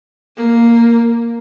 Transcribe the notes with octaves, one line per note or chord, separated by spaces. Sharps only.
A#3